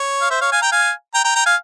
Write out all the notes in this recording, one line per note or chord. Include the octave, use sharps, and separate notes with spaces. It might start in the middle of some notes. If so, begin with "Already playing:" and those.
Already playing: C#5
F5
C5 E5
C#5 F5
F5 G#5
G5 A#5
F5 G#5
G5 A#5
G5 A#5
G5 A#5
F5 G#5